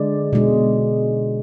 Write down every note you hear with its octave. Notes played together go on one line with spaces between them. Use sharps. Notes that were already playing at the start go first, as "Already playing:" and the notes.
Already playing: D3 G#3 D5
B2 G#3